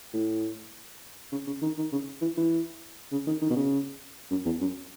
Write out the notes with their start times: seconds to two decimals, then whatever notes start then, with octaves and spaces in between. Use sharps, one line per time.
0.14 A2
1.32 C#3
1.47 C#3
1.62 D#3
1.77 D#3
1.92 C#3
2.21 E3
2.37 E3
3.12 C#3
3.27 D#3
3.41 D#3
3.50 B2
3.56 C#3
4.31 F#2
4.45 E2
4.61 F#2